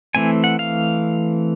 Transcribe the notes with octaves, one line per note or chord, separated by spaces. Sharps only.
E3 A3 C4 G#5
F#5
F5